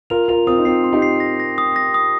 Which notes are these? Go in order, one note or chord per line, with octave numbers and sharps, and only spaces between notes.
F4 A#4 F7
F4 A#4 F7
C4 F4 D#6
D#4
C4 F4 C7
C6
D#4 G4
C7
A#6
A#6
D#6
A#6
D#6